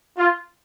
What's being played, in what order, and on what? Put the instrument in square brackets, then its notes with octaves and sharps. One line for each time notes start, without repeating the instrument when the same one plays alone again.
[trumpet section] F4